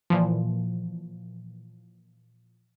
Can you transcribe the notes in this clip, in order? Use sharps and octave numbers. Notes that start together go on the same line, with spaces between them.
A#2 E3 F3